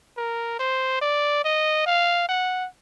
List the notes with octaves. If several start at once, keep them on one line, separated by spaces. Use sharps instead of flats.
A#4
C5
D5
D#5
F5
F#5